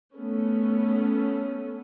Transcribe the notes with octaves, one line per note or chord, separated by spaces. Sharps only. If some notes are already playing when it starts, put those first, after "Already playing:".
A3 B3 C#4